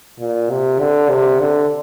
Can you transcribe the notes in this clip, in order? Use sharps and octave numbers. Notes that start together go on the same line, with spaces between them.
A#2
C3
D3
C3
D3